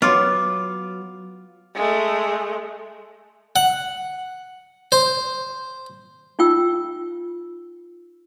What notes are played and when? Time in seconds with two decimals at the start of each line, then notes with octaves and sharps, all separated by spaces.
0.02 F#3 B3 F4 D6
1.75 G#3 A3
3.56 F#5
4.92 C5
6.39 D#4 F4 G5 E6